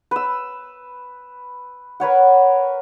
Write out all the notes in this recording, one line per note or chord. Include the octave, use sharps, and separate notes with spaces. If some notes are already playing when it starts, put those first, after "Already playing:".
B4 E6
A#4 B4 C#5 F#5